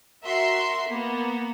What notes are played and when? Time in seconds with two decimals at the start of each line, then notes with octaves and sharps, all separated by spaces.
0.22 F#4 A#4 E5 C6
0.87 A#3 B3